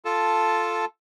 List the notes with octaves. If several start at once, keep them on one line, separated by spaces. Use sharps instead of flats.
F4 A4 A5